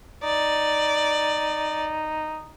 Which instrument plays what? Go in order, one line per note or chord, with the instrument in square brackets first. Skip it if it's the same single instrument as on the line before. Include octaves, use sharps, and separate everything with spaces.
[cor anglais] D#4 [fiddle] D5